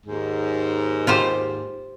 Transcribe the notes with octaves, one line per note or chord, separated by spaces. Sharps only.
D#2 G#2
F4 G4 C5